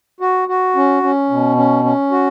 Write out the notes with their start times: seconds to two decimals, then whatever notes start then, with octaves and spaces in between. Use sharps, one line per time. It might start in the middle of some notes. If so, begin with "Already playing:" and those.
0.20 F#4
0.48 F#4
0.76 C#4
1.03 C#4
1.30 B2
1.57 C#4
1.84 C#4
2.11 F#4